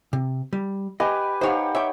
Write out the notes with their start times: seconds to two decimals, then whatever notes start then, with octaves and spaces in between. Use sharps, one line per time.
0.13 C3
0.53 G3
1.00 G4 B4 D#5 G#5
1.41 D#4 G4 C5 C#5 F5 F#5
1.75 C#5 E5 G5